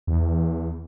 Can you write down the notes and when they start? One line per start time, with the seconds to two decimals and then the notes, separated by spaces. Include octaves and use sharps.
0.07 E2